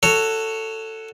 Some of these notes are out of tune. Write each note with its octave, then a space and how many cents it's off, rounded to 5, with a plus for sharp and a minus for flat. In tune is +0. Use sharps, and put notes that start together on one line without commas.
F#4 +0 A4 +15 C#5 +0